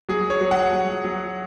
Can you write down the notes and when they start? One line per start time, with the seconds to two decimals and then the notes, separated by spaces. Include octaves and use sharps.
0.09 F#3 G#4
0.30 C#5
0.41 F#3
0.51 F#5
0.72 F#3
1.04 F#3